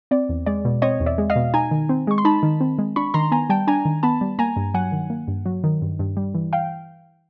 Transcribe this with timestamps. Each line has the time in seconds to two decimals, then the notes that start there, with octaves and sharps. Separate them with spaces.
0.11 C4 D5
0.29 E2
0.46 G#3 D5
0.65 B2
0.82 C4 C#5 D#5
1.00 E2
1.06 D5 E5
1.18 G#3
1.30 D#5 F5
1.36 B2
1.54 D#4 G#5 A#5
1.71 D#3
1.89 C4
2.07 G#3 C#6
2.18 C6
2.25 D#4 A5 B5
2.43 D#3
2.61 C4
2.79 G#3
2.96 D4 B5 C#6
3.14 D#3 A#5 C6
3.32 B3 G#5 A#5
3.49 G3 G5 A5
3.67 D4 G#5 A#5
3.85 D#3
4.03 B3 A5 B5
4.21 G3
4.39 A#3 G#5 A#5
4.56 G2
4.74 F#3 F#5 G#5
4.92 D#3
5.10 A#3
5.28 G2
5.46 F#3
5.64 D#3
5.82 G2
5.99 G2
6.17 G3
6.35 E3
6.53 F5 G5